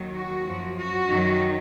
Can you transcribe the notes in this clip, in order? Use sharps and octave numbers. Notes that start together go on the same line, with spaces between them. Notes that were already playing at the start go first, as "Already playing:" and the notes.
Already playing: D#2 D#3 F#3
F#4
F#2 F3
F#4
F#2 D#3 F#3